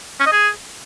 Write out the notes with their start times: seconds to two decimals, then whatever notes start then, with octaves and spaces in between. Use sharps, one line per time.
0.20 C#4
0.26 D#5
0.32 G#4